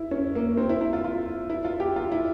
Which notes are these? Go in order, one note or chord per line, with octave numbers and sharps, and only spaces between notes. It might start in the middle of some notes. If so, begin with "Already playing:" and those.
Already playing: E4
C#4
A#3
C4
E4
E4
F4
F4
E4
F4
G4
F4
E4